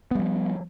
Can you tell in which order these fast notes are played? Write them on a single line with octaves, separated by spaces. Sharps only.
B3 G3 F3